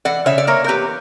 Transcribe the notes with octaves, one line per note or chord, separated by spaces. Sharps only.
E3 D5 F#5
C#3 C#5 E5
D5
A#3 A#4 C#5
A#4
E2 G4 B4